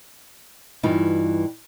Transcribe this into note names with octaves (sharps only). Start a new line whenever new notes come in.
G2 E3 D#4 F4